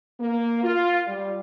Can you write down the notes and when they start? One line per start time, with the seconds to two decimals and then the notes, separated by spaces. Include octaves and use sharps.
0.20 A#3
0.63 F4
1.07 G3